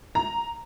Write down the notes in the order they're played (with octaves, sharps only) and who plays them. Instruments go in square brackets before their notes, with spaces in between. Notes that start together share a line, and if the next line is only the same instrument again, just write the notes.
[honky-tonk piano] A#5